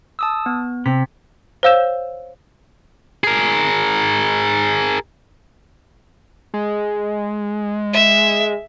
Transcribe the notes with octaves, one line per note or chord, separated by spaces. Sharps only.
A5 D#6 E6
B3
C3 B6
C5 C#5 F5 E6 G6 E7
G#4 A#4
G#3
E5